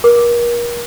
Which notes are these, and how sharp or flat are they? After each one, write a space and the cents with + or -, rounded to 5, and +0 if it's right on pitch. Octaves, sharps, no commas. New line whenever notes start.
A#4 +35 D6 +0